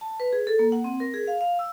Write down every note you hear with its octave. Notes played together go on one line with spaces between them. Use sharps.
A5
B4
G#4
A4
A#3
F#5
C4
A#4
G#4
F5
F5
E6